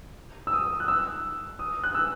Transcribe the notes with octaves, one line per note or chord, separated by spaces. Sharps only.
E6
D#6
F#6
E6
D#6
F#6
E6